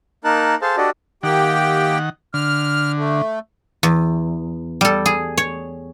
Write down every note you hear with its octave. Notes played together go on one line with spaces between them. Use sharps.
A#3 D#4 A#4 A5 F#6
G#4 A4 C5 F5 A5
D4 F#4 G4 A4 D5 D#5
D#3 A#3 G4 F#5 G5
D3 F6
A3
E2
G3 A4
G#4
C#5